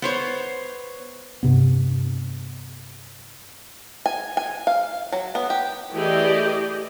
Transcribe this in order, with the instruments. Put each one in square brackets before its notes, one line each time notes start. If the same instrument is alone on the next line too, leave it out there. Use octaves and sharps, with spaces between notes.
[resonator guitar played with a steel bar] B3 C5 C#5
[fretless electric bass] G2 C3 B3
[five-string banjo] G#5
G#5
F5
F#3
B3
G4
[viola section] E3 A3 G4 G#4 D5 D#5